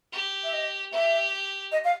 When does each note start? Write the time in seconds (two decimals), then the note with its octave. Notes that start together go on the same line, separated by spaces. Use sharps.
0.13 G4
0.43 E5
0.53 D#5
0.93 G4 E5
1.71 D#5
1.84 F5